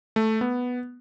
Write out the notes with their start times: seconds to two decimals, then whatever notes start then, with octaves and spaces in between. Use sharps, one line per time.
0.16 A3
0.41 B3